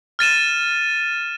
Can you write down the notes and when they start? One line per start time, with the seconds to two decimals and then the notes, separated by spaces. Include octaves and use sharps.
0.19 F6 A6 D#7 E7